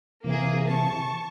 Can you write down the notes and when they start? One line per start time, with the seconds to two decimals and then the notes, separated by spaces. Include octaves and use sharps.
0.24 C3 E3 A#3 G#4
0.67 A5 C#6